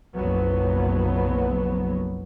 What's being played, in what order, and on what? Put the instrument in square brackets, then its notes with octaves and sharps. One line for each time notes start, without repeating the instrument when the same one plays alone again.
[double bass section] F#1 B1 F3 F#3 B3